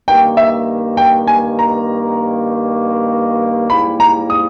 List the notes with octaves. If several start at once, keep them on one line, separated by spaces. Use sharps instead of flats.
G2 D#3 A#3 G5
E5
G5
G#5
A#5
G#2 G3 A#3 E4 B5
A#5
D#6